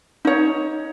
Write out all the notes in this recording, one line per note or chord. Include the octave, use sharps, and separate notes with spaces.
D#4 C#5